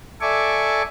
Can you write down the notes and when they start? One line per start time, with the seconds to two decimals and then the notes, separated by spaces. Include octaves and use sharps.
0.21 A4 D5 E5 G#5 C#6 D6